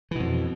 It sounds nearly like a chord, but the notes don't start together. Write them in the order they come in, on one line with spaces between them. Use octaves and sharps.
E3 B2 F2